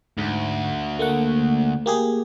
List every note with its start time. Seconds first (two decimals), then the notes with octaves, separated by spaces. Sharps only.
0.18 D2 G#2
0.99 A3 A#3 F#5
1.86 A#3 G4 G#4